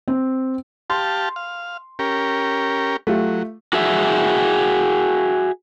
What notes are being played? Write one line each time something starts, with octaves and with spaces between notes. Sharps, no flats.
C4
G4 F5 A5 C6
F5
C#4 G4 A#4
F#3 A3 F4 G4
F#4 G#4 E5